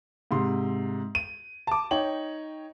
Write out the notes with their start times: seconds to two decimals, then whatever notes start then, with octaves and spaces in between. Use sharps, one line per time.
0.31 G#2 C3 C6
1.15 D#7
1.67 A5 D6
1.91 D#4 C#5 G5 F#7